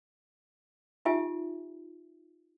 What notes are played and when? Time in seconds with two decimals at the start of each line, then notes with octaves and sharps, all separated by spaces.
1.05 D#4 F4 G4 E5 G#5